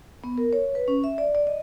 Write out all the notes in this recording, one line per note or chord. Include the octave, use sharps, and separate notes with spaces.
B3
A#4
C#5
B4
C#4
E5
D5
D5
D#5